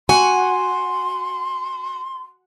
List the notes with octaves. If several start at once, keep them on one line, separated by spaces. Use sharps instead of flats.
F#4 G#5 C6